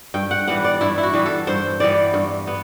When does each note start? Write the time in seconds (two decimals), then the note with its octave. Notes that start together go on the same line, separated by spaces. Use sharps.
0.14 G2 G5
0.31 F#5
0.47 E3 G3 B3 F#5
0.64 D5
0.81 G2 E4
0.98 E4
1.03 F#4
1.13 E3 G3 B3
1.26 A4
1.47 G2 C5
1.80 E3 G3 B3 D5
2.14 G2
2.47 B3